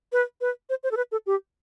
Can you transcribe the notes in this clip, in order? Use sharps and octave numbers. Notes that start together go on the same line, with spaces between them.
B4
B4
C5
C5
A4
B4
A4
G4